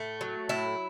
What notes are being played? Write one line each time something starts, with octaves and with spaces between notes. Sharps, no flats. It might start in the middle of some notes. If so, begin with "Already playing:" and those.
Already playing: A2 A3
F#3
A2 E4